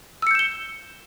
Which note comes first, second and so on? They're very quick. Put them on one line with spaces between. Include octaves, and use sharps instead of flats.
E6 C#7 G6 E7 G7